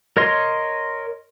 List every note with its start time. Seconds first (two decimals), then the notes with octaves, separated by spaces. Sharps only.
0.17 A#4 C#5 D#5 C6